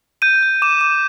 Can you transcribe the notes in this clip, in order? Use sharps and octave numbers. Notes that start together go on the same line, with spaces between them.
G6 D#7
G6
D6 E7
D6